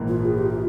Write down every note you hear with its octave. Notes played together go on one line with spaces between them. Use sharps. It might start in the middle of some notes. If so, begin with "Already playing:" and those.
Already playing: A#1 G#2 E3 A#3
F4
G#4
G4
F4